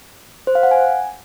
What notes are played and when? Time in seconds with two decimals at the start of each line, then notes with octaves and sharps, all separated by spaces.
0.47 C5
0.55 F5
0.63 F#5
0.71 G#5